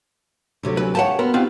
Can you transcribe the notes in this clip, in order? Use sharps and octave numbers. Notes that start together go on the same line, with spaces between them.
D2 C3 F#3 D4 F#4 A4
F#4 B4 G#5
G4 B4 C#5 F5 F#5 G#5 A5
B3 F#4 A#4 B4 C6
B3 C4 D#4 F4 G4 D#5